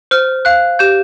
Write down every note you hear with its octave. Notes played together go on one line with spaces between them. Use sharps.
C5 F6
F5 F#6
G4 G6